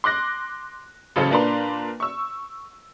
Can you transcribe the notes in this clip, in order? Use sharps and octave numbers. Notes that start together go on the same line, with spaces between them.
C6 D6 F#6 A#6
A1 C#3 F#3 C#4 A4 C5
A#2 A#3 D4 B4 A#5 C6
C#6 E6